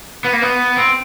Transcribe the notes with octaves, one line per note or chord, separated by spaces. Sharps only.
B3
A#3
B3
C4